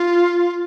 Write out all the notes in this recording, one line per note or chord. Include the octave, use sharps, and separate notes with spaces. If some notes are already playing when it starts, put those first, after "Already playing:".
Already playing: F4